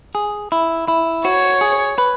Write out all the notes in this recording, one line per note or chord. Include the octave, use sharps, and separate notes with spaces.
G#4
E4
E4
F#4 C#5
G#4
B4